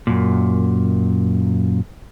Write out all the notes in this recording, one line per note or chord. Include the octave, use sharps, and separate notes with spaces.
F#2 A#2